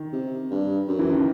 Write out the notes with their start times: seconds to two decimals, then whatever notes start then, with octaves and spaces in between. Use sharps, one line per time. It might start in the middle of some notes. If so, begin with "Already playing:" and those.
Already playing: D#3
0.13 C3
0.51 G2
0.88 F#2
0.99 E3
1.12 D#3